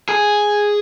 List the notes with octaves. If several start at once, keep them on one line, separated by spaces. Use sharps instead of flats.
G#4